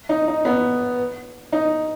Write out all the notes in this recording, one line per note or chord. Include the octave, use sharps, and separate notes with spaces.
D#4
D#4
B3
D#4